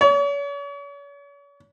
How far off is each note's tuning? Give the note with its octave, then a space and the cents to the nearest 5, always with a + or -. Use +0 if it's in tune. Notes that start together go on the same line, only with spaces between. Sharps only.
C#5 +40